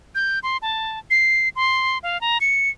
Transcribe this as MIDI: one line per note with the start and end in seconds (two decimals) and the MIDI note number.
0.15 0.39 91
0.43 0.57 84
0.62 0.99 81
1.10 1.49 96
1.56 1.98 84
2.03 2.20 77
2.21 2.38 82
2.41 2.70 97